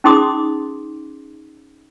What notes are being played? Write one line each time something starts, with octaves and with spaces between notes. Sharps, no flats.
C#4 D#4 G#4 C6 D6 D#6